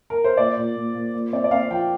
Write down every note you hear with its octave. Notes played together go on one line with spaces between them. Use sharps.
A#4
C5
A#2 D5
A#2
A#2
A#2
A#2
C4 D5
D5
C4 F5
F3 G5